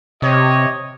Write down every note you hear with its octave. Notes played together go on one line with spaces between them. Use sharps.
C3 G4 C#5 D#5